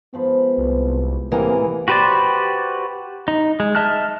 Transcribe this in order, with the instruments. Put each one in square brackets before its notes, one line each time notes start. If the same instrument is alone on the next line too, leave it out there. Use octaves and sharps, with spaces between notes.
[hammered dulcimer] G#2 F3 B5 [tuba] B3
[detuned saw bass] C2
[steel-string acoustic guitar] A2 E3 A#4 [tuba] C3 [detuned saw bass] A#3 [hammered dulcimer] G#4
[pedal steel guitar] F#4 G4 B4 C5 D5
D#4
G#3
D#5 E5 A5 F6 F#6